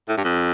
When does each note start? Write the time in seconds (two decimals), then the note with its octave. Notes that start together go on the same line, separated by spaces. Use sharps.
0.09 A2
0.17 G2
0.24 F2